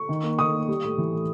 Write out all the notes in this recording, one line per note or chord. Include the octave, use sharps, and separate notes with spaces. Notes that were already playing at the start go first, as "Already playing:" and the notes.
Already playing: C#6
D#3
A#3
D#3 C#6 D#6
A#3
G3
A2
E3
A2